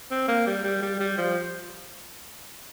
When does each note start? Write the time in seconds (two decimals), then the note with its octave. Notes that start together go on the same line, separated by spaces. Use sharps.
0.11 C4
0.28 A#3
0.47 G3
0.64 G3
0.83 G3
1.00 G3
1.18 F3